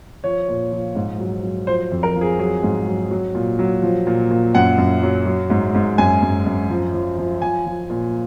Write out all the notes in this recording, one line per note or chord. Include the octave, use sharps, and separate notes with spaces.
F3 C#5
A#2
F3
G#2
F#3
F#3
F3 C5
F2
A#4
F3
G#4
F#3 G#4
G#2
F#3
F#3
A#2
F#3
F3
A#2
A#2
F#2 F#5
F#2
F#3
F#3
G#2
G#2
F#2 G#5
F#2
F#2
F3
F3
F3
F3 G#5
F3
A#2